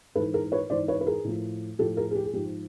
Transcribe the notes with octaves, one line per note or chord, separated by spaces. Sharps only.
G#2 E3 A4 B4
G#4 A#4
B4 C#5
G#2 E3 C5 D5
B4 C#5
B4
G#4 A#4
A2 F3
A2 F3 G4 A4
G#4 A#4
G#4
G4
G#4
G#2 F3 G4